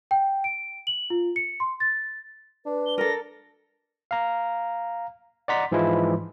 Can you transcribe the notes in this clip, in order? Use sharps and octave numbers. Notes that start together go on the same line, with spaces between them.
G5
D7
F#7
F4
C#7
C6
A6
D4 B4
G7
A4 A#4 A#6
F5 A#5
D5 D#5 F#5 A#5 C6 B6
G#2 E3 F3 G#3 E4 F4